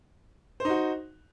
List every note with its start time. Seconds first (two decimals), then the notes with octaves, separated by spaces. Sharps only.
0.60 C5
0.65 D#4
0.70 F#4